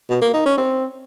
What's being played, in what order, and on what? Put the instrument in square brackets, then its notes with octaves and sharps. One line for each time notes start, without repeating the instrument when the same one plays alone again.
[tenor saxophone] B2
A#3
D#4
C#4
C4